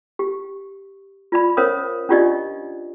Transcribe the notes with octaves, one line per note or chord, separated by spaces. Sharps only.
G4
F4 D5 B5
C#4 A#4 C5 C#5 F5 D#6
C#4 D4 F4 G4 D5 D#5